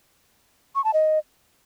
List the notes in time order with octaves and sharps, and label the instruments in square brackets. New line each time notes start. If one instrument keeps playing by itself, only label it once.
[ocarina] C#6
A5
D#5